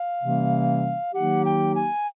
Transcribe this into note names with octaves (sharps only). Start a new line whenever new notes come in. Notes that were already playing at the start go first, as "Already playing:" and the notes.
Already playing: F5
C3 E3 G3 A#3 C#4
D#3 F#3 A#3 D#4 G4 F#5
G5
G#5